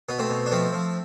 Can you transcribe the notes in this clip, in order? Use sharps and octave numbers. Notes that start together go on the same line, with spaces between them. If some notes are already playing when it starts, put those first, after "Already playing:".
B2 B3
A3 C4
B2
D4
F3 A3 C4
F3